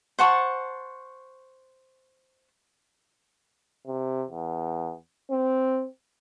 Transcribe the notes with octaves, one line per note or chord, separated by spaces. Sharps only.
C5 F#5 A5 C#6
C3
E2
C4